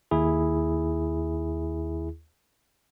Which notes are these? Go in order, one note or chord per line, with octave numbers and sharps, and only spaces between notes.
D#2 E4 G#4